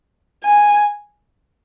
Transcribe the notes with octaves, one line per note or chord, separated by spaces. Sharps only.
G#5